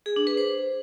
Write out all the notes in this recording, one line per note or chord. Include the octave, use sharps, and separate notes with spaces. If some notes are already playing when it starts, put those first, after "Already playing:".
G#4
D4
B4
C5